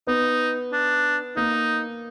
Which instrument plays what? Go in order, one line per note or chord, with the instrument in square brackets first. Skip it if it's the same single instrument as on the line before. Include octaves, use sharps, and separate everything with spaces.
[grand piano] B3 [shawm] D#4
[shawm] D4
[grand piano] A#3 [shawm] D#4